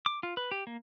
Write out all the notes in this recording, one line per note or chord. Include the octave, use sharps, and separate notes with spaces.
D6
F4
B4
G4
A#3